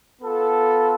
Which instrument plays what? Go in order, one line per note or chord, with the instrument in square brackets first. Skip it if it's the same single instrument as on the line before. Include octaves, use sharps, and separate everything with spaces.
[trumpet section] B3 F4 A4